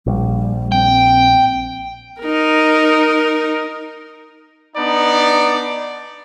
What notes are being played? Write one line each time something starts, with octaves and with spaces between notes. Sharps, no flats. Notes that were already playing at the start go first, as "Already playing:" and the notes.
A#1 G3
C4 G5
D#4 A#4
B3 D4 D#4 D5